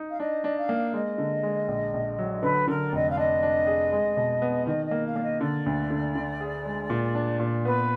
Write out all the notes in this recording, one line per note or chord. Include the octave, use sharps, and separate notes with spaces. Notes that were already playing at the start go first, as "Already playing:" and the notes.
Already playing: D#4
F5
D4 D#5
D4
F5
A#3
G#3 D#5
D3
G#3
A#1
A#1
F#3
D3 B4
D3 A#4
D5
F1 D#5
F5
D4 D#5
D4
G#4
G#3
B2
B3
D#3 D#5
D#5
A#3
F5
A#3 D5
D#5
D3 D5
D2
D3
D3
G#4
G#3
A#2
D4
A#2
B3 B4